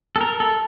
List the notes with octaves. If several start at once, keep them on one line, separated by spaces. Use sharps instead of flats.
A4
A#4
A4